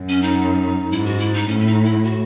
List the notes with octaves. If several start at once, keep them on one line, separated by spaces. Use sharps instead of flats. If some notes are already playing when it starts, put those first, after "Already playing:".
Already playing: F#2
C#4
D#4
G#2 E4
F#4
E4
D#4
A2 C#4
C#4
D#4
E4
F#4